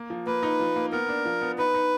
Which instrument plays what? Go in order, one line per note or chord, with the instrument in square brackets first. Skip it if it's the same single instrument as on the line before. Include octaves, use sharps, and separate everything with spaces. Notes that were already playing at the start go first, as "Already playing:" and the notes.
Already playing: [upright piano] A#3
F3
[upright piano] A#3 [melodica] B4
[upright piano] D#4
F3
A#3
[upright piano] B3 [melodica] A#4
[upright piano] D4
F3
B3
[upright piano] D#4 [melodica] B4
[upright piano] D#4